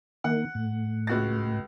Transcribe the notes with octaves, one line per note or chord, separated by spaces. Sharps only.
D#3 A#3 F#5
A2
C#2 F#4 A6